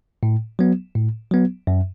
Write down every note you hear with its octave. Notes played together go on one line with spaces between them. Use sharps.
A2
F#3 B3
A2
F#3 B3
F#2